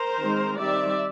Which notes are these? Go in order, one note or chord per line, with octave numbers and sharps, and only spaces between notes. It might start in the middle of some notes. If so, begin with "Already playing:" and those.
Already playing: A#4 C5
D#3 G#3 C4 D#4
D#3 G3 C4 D#4 D5 E5